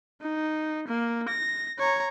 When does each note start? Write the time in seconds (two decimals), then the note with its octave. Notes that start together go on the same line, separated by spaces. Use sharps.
0.21 D#4
0.88 A#3
1.29 A#6
1.79 C#5 A#5